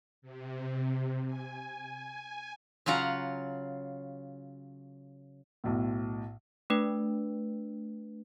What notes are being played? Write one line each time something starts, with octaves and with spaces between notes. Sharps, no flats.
C3
G#5
C#3 F#3 F4 F#5 A#5
B1 A2
A3 D4 B4